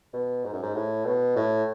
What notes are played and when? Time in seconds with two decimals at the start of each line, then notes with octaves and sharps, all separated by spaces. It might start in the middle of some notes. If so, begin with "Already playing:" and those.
0.13 B2
0.44 G#2
0.53 F#2
0.62 G#2
0.75 A2
1.05 B2
1.36 A2